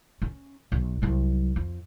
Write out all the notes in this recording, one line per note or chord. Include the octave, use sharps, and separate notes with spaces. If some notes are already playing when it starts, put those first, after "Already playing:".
C#4
B1
C2 F#3
F2